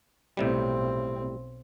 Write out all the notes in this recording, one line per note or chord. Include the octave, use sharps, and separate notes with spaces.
B1 A2 C3 G3 C4